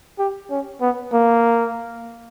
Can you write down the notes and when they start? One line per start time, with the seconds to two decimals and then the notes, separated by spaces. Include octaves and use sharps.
0.19 G4
0.50 C#4
0.81 B3
1.13 A#3